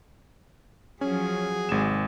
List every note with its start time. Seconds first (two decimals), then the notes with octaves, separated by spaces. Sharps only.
1.01 F3 F#3 C#4 F#4 G#4
1.69 G#1 C3 G#3 E7